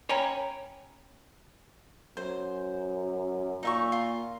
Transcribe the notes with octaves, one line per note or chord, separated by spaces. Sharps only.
C#4 C#5 G5 G#5 A#5 B5
F#2 C5
A#2 D#4 E5 C#6
F4